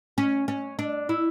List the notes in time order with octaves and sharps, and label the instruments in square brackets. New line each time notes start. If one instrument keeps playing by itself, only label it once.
[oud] C#4
C#4
D4
E4